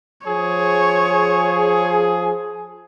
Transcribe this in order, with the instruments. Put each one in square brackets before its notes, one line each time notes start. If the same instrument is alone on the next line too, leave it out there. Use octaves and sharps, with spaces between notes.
[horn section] F3 G#4 [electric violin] C#5